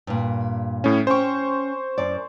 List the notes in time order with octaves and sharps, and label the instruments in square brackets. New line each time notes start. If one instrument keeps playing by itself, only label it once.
[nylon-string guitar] G2 A#2
[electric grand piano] A2 C#4
[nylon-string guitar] C#4 G5 [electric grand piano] C5 C#6
[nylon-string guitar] F#2 D5